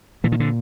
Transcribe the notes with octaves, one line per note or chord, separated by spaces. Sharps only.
A#2 E3
D#3
D3